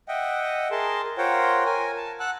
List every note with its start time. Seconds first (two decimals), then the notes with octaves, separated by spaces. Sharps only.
0.08 D#5 E5 F#5 G5
0.71 G#4 A#4 A5 C6
1.18 F4 A#4 C5 C#5 F#5 G5
1.66 A#4 G#5
1.97 A5
2.20 F#5 A5 E6 F#6